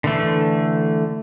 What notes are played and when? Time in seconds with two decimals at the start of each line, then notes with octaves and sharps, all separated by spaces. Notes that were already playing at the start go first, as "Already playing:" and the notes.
0.04 D3 E3 A3